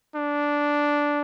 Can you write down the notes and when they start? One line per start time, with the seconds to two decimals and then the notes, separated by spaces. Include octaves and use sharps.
0.16 D4